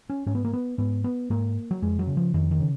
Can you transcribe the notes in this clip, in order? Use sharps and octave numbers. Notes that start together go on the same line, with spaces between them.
C#4
G#2 C#4
B3
A#3
B3
G#2 B3
B3
G#2 A#3
F#3
F2 G#3
F#3
C#3
F3
F2 D#3
D#3
C#3